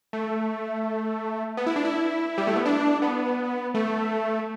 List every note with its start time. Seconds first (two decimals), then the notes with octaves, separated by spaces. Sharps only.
0.13 A3
1.57 B3
1.67 E4
1.76 D4
1.85 E4
2.38 G3
2.47 A3
2.56 B3
2.66 D4
3.02 B3
3.74 A3